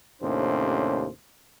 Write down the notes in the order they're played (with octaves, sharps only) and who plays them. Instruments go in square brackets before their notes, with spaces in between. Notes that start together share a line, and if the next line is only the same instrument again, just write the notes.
[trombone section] D#2 A2 C3 C#4 D4 C5